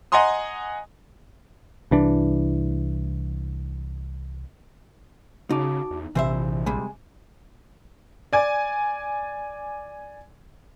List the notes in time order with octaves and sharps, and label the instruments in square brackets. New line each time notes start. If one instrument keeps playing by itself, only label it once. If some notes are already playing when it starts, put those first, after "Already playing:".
[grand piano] D#5 F#5 G#5 A#5 C6 D#6
[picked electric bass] C2 E3 D4
[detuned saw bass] C#3 [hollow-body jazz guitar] D#4 [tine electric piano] F#4 A5 D6
[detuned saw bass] E2
[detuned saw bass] A#1 [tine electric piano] C3 [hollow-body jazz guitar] E3 C5 E5
[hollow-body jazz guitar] C3 G3 G#3 [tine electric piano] G#5
[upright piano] D5 G#5